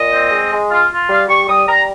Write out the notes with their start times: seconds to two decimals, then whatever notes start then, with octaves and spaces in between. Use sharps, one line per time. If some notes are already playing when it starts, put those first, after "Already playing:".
Already playing: A#2 D#5
0.12 C4
0.31 G#3
0.52 G#3
0.71 F4
0.91 F4
1.09 G3 F5
1.29 G3 C#6
1.48 G3 D#6
1.68 G3 A#5